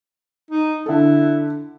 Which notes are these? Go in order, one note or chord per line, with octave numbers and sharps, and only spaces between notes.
D#4
D3 E4 A4